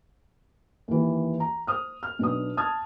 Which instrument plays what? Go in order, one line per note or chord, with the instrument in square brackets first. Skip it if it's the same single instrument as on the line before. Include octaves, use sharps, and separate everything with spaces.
[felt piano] D#2 E3
A#5
C5 D#6 F6
F6
B1 D4 B4 D#6
A5 D#6 F6 G#6